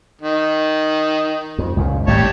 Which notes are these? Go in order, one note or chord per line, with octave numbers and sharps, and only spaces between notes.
D#3
F2
C#2 F#2 A#2
G#1 A2 G3 G4 C#5 A5